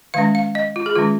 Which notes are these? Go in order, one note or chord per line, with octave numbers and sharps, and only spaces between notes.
D#3 G#3 C#4 F5
F5
D#5
F4
G#4
D#3 G#3 C#4 F4